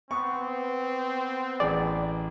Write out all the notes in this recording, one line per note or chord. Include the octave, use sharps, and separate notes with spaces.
B3 C4 C#6
A1 G#4 D5